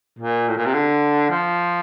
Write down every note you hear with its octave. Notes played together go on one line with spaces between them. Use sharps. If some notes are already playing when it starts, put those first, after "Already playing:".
A#2
A2
A#2
C3
D3
F3